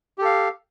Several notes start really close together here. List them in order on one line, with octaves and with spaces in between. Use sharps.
G4 A4 F5